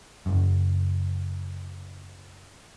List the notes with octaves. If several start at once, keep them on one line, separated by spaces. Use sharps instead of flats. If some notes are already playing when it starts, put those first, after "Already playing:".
F#1 F#2